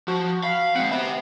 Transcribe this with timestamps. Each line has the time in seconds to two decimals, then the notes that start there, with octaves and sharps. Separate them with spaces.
0.08 F3 F#4
0.43 F5 B5
0.75 G#3 C4 F#5
0.92 B3 C5 E5